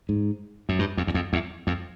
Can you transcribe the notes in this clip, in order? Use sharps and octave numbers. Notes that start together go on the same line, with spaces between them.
G#2
F#2
G2
F2
E2
F2
E2
F2